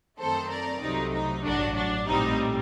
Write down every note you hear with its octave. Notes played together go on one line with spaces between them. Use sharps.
F#2 D#3 A3 C4 A4 C5
A#4 D5
C2 C3 F#3 A3 D#4
D#4
A1 G2 F#3 D4 F#4
D4
A#1 A2 G3 C4 D#4